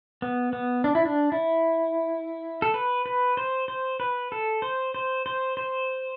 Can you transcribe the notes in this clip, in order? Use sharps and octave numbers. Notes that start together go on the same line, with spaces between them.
B3
B3
D4
E4
D4
E4
A4
B4
B4
C5
C5
B4
A4
C5
C5
C5
C5